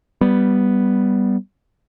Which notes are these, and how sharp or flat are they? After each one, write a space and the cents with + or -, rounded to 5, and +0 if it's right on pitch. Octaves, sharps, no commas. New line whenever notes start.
G3 +0 B3 +0